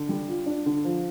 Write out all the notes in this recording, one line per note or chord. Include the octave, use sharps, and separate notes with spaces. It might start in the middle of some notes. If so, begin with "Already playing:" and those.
Already playing: D3
G3
F4
D4
D3
F3